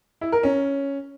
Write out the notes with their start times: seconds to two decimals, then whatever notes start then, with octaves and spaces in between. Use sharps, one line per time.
0.21 E4
0.32 A#4
0.43 C#4